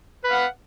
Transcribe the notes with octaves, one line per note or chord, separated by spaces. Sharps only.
B4 F5 F#5